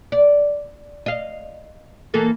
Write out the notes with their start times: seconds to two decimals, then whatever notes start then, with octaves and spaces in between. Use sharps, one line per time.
0.12 D5
1.06 D#5 F5
2.14 E3 A#3 A4